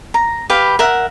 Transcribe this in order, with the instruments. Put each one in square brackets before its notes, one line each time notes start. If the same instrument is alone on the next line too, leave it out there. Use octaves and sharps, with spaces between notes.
[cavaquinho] A#5
G4 B4 F5 B5
A#4 E5 F#5